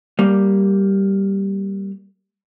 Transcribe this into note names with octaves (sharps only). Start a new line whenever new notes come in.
G3 A#3